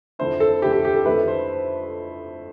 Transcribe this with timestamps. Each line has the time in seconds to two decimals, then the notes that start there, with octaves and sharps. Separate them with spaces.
0.19 F2 D3 A3 E4 C5
0.40 A4
0.62 F2 D3 A3 E4 G4
0.73 G4
0.85 G4
0.95 A4
1.05 F2 D3 A3 E4 B4
1.28 C5